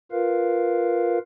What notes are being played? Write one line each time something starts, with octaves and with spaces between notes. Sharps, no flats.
F4 A#4 B4 F5